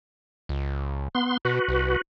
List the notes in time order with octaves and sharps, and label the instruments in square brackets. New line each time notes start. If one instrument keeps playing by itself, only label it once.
[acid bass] C#2
[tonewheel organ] B3 C6
[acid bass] B2 [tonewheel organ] F#4 B4
[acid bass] C2